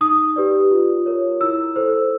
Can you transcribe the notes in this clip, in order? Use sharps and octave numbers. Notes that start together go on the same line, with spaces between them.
D#4 D#6
G4 B4 D5
F4
A#4 C#5
E4 E6
A4 C5